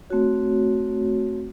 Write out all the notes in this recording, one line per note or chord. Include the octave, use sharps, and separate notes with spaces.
A3 C4 F#4 C#5